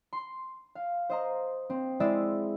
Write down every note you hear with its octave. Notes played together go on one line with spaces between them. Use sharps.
C6
F5
C5 D#5 A#5
C4
G#3 E4 G#4 D5 E5